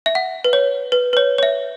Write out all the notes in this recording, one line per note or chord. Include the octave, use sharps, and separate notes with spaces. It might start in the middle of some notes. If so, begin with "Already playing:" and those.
E5
F#5
B4
C#5
B4
B4
C#5
C#5
E5